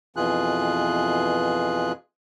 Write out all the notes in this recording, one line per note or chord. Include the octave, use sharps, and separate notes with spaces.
F2 B2 E3 F4 G#4 F#6